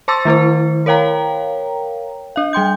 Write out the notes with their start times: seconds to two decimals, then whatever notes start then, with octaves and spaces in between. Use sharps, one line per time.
0.08 C5 A5 C6 D6 E6 A6
0.25 D#3 A3 E4 C5
0.86 A#4 C#5 F5 G5 A#5
2.36 D4 F5
2.53 G3 G5 C6 G6